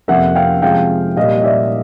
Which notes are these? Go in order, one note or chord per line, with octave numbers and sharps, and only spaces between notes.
F2 C3 F3 A#3 E5 F#5
F5 G5
C3 F3 G#3 F5 G5
A#2 G3 A#3 D#5 F5
D#5
D5 E5